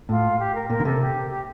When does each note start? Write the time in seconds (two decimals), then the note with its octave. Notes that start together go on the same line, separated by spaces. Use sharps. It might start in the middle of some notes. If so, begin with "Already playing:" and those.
0.09 A2 F4
0.39 G4
0.54 A#4
0.69 A#2 A#4
0.80 D3
0.85 C3 A4
1.01 G4
1.30 G4